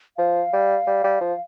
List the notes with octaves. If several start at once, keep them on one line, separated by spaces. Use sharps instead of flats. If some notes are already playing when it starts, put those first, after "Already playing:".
F3 F5
G3
G3
G3
F3